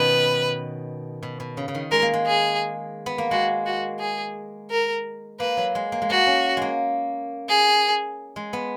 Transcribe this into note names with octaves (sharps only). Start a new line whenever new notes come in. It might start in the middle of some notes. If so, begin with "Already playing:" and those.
Already playing: B2 D#3 B3 C#4 B4
B2
B2
C#3
C#3
D#3
G#3 A#4
A#3
G#3
G#4
B3
A#3
G#3 F#4
F#4
G#4
A#4
A#3 B4
F#3
G#3
A#3
G#3
A#3 F#4
C#4
G#3 A#3
G#4
G#3
B3